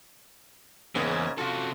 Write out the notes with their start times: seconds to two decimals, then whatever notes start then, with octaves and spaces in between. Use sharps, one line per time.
0.95 E2 G#2 C#3 A#3
1.38 C3 F4 F#4 A4